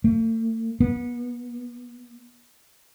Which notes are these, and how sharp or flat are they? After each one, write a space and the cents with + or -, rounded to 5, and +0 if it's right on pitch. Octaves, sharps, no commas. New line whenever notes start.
A3 +40
B3 -30